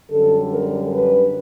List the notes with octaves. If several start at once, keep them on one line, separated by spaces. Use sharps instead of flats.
F#2 D3 G3 A4
A#4
B4